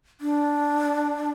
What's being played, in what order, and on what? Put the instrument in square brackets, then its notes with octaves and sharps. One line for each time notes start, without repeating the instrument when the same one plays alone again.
[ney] D4